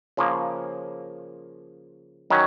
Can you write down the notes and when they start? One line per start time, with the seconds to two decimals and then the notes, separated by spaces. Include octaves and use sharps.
0.17 C#3 F3 A#3
2.30 D#3 F#3 C#4